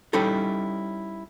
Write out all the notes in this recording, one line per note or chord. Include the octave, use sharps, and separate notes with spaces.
G3 C#4 D#4 E4 A4